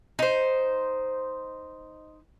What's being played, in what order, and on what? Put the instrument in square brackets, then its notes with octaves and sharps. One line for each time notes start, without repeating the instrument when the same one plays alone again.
[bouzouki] D#4 C5